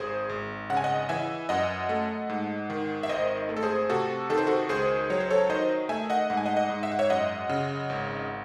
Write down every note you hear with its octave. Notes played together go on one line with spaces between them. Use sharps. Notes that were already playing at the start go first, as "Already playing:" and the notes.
Already playing: G#1 G#4 C5
G#1
C#3 F#5
G#5
D#5 F#5
E3 E5 G#5
F#2 D#5 F#5
A3
G#2
D#3
E5
G#1 C5 D#5
A3
A4
G#4 C5
C3 F#4 A4
D#3 A4
C5
F#4 A4
C#2 G#4 C5
F#3 C#5
C5
A4 C#5
D#3 C5 D#5
A3 E5 G#5
D#5 F#5
G#2 F#5
G#5
D#5 F#5
D#5 F#5
G#2
E5
F#5
C#5 E5
F#2 D#5 F#5
C#3
G#1